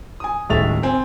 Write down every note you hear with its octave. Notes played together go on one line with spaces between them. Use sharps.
G#5 D#6
D#1 A2 G#3 E5 A6 F7
C4 G#5